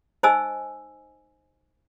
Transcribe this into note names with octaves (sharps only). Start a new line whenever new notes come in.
D#4 C5 D#5 G#5 E6